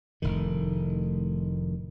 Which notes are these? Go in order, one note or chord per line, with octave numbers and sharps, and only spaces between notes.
F1 A2 D#3